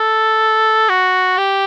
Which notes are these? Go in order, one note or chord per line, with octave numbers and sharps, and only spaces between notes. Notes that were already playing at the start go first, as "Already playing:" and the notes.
Already playing: A4
F#4
G4